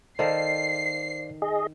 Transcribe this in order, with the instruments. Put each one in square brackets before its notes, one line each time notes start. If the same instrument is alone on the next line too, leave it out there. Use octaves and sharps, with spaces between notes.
[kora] D#3 A4 [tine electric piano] C5 D5 F5 [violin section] C7
[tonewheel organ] G#4 D#5